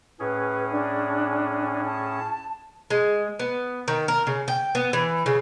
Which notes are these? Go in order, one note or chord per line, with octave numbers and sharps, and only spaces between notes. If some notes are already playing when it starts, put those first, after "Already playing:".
A2 C#4 G#4 B4
D4
A5
G#3
B3
D#3
A#4
C#3
G5
B3
E3
C#3